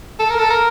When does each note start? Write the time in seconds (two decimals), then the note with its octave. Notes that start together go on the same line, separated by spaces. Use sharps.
0.19 A4
0.30 A#4
0.39 A4
0.50 A#4